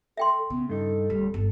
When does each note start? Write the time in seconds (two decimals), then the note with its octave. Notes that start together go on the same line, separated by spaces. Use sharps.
0.17 A4 E5 G5 C6
0.50 C#3 B3
0.69 G2 D#4 A4
1.10 D1 G3
1.34 G1 A4